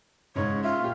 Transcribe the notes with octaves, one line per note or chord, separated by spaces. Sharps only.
G#2 C#3 C#5
F4 E5
A#2 G4